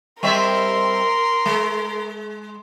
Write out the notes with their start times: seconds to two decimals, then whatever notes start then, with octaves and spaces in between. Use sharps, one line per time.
0.23 G3 C4 A#4 E5 C6
1.46 G#3